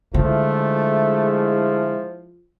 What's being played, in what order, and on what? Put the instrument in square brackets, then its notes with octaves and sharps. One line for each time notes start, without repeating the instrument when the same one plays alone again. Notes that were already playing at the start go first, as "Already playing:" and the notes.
[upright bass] D3 [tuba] F3 [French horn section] G#3 E4 [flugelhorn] A3